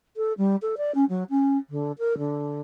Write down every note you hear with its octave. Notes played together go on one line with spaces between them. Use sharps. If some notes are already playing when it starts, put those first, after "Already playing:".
A4
G3
A4
D5
C#4
F#3
C#4
D3
A#4
D3